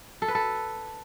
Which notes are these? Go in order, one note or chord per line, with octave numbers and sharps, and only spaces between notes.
A4
B4
A4